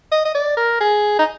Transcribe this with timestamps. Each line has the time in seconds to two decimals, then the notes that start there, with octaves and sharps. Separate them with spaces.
0.12 D#5
0.25 D#5
0.35 D5
0.57 A#4
0.80 G#4
1.19 D#4